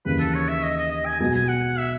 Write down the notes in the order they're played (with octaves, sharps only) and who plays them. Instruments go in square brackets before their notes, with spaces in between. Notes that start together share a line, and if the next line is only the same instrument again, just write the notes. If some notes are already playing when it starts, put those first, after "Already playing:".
[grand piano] D#2 C#3 E3 [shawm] B4
[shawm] A4
C#5
E5
D#5
D#5
D#5
G#5
[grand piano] B1 B2 G#3 [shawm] G#5
[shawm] G#5
F#5
E5